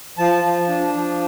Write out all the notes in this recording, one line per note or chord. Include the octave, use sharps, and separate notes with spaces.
F3 A5
F3
D4
F3